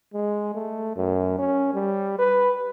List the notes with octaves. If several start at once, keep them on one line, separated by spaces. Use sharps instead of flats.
G#3
A3
F#2
C#4
G3
B4